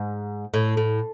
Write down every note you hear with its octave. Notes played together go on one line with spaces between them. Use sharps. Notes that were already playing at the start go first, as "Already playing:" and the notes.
Already playing: G#2
A2
A2